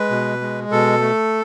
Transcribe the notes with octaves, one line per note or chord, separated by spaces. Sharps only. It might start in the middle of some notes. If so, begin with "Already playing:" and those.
Already playing: G#3 B4
B2
G#3
B2 A4
A3